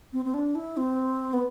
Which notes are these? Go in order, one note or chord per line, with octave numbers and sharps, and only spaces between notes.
C4
C4
D4
E4
C4
B3